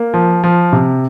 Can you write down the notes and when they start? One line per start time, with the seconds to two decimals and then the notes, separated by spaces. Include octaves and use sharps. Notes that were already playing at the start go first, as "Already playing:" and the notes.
Already playing: A#3
0.14 F3
0.44 F3
0.73 C3